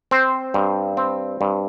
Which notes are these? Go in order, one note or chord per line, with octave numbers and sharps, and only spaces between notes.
C4 C5
G2
C4
G2